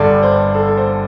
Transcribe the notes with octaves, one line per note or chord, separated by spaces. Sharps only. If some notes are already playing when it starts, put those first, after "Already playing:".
Already playing: G1 G2 D3 A4 D5
C5
A4
A4
C5